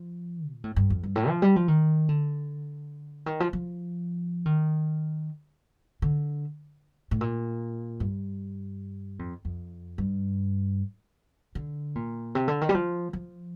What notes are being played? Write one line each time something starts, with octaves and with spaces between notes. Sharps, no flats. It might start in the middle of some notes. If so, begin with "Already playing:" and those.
Already playing: F3
A#2
A2
G2
F2
G2
A2
F3
G3
F3
D#3
D3
D#3
F3
F3
D#3
D3
A2
A#2
G2
F2
F2
G2
D3
A#2
C3
D3
D#3
G3
F3
F3